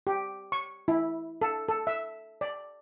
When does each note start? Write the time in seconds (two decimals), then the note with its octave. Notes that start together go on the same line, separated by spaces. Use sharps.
0.07 G4
0.52 C#6
0.88 E4
1.42 A4
1.68 A4
1.87 E5
2.41 D5